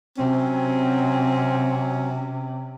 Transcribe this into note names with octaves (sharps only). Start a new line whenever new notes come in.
C3 F#3 C4 C#4